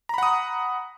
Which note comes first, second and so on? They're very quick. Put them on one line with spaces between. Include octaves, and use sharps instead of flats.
A#5 B5 F#5 D#6